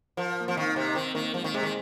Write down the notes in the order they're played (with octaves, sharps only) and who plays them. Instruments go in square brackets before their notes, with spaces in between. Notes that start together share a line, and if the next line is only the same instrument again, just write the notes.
[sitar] F3 [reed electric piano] A#4
[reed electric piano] A#3
[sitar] F3 [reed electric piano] C4
[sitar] D#3 [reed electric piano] D#4
[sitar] C3 [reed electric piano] D#4
[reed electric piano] D#4
[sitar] D#3 [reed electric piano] C4
[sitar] D#3 [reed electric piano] A#3
[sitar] F3 [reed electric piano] G#3
[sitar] D#3
[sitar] C3 [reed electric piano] G#3
[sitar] D#3